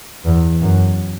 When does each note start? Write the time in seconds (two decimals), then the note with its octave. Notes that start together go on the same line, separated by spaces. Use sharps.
0.25 E2
0.61 F#2